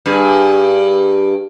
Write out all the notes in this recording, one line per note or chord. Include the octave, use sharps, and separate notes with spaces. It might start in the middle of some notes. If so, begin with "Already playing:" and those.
G2 G#4